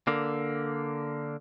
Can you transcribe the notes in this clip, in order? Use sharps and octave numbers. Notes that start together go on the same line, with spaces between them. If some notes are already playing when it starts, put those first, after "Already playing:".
D3 A#3